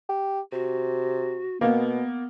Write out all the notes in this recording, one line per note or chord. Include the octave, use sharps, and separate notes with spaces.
G4
C3 F#4
B2 A#3 B3